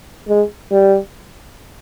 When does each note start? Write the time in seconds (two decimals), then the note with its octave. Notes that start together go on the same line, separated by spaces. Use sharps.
0.29 G#3
0.71 G3